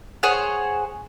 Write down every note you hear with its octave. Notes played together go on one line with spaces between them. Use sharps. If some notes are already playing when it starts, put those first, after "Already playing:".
G#4 C5 C#5 F#5